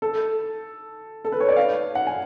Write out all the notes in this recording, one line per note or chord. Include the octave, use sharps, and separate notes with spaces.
A4
A4
B4
C#5
D5
F5
F#5
G#5